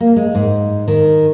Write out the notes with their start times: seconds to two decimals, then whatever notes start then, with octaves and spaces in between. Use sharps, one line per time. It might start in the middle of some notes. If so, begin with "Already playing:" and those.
0.01 A#3
0.16 G#3
0.35 G#2
0.88 D#3